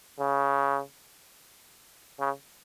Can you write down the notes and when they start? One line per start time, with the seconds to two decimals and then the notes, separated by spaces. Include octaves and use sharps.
0.20 C#3
2.19 C#3